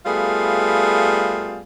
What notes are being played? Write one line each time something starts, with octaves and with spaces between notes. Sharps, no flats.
G3 A3 B3 F4 G#4 F5